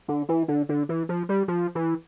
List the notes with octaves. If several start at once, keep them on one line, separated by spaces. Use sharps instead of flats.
D3
E3
D3
D3
E3
F3
G3
F3
E3